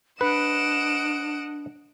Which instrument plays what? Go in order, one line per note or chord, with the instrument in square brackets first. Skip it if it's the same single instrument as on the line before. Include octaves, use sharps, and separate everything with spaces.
[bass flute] D4 [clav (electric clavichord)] B4 [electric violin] D#5 F#5 [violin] D7 E7